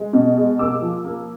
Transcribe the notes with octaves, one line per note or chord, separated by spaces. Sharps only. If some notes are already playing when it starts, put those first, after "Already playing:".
Already playing: G#3
B2
G#3
A#3 D6 E6
F3
A#3